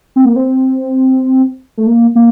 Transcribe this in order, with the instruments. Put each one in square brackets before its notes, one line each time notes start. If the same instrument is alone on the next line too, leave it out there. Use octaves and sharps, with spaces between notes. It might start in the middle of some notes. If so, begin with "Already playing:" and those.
[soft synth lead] C4
A#3
C4
A3
A#3
A#3